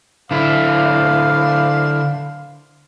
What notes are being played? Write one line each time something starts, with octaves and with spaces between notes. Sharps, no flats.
D3 E4 C5 D5 F5